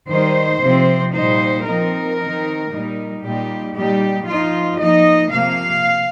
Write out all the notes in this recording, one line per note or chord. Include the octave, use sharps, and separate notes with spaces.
D#3 G3 D#4 C5
C3 F3 C4
A#2 G3 D#4 C5
F3 C4 D#4 A#4
D#3 C4 D#4
A#2 G3 D#4
A#2 G3 D#4 G4
A#2 G3 D#4 G4
F3 D#4 F4
F3 A#3 D#4 D#5
C3 F3 A#3 F5